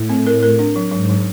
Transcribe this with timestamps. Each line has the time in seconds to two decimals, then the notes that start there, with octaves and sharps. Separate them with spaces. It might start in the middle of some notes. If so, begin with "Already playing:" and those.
Already playing: A2
0.09 C4
0.27 A#4
0.43 A#4
0.59 D4
0.76 F#3
0.92 G#2 F#3
1.09 F#3